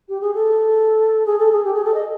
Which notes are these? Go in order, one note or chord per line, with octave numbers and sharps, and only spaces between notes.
G4
G#4
A4
G#4
A4
G#4
G4
G#4
A4
D#5